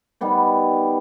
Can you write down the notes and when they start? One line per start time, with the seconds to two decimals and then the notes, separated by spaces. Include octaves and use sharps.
0.21 D#3 G3 B3 G4